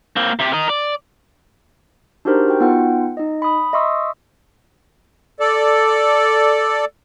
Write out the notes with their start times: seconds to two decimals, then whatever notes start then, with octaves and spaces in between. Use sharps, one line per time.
0.16 A#3 C4
0.39 C3 G4
0.53 A#4 D#5
0.69 D5
2.25 D4 D#4 F#4 G4 A#4 C5
2.48 F#4 G5
2.60 B3 D#4 F4 F#5 G5
3.17 D#4 D#5
3.42 B5 D#6
3.73 D#5 E5 C6 C#6 D#6 E6
5.40 A4 D5